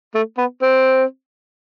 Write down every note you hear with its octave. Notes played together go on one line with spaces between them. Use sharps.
A3
B3
C4